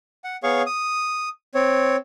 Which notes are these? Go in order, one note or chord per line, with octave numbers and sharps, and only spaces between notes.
F#5
B3 G#4 C#5 F5 C#6
D#6
C4 C#5